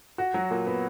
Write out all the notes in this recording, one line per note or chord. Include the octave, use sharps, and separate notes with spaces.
F#4
F#3
A#2
B3